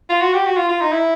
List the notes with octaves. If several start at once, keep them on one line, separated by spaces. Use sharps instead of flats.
F4
F#4
G4
F#4
F4
F4
D#4
E4